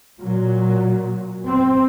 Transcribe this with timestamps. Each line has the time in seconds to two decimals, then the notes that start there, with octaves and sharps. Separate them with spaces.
0.19 A#2 F#3
1.47 C4